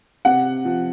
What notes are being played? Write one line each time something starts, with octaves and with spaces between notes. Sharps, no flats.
C3 F#5
F3